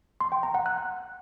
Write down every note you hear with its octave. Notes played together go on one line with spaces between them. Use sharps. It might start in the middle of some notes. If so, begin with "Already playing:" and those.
C6
G5
A#5
F#5
F#6